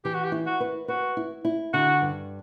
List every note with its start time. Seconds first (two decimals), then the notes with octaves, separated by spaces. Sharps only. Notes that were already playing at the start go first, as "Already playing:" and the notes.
0.05 E3 G4
0.14 F#4
0.24 G4
0.32 E4
0.47 F#4
0.60 B4
0.88 F#4 B4
1.17 E4
1.45 E4
1.73 D3 F#4
2.01 G2